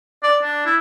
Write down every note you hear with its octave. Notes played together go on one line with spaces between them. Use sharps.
D5
D4
E4